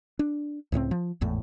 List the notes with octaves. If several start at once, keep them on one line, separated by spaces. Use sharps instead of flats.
D4
C#2 A2 F#3 C4
F3
G#1 E2 A2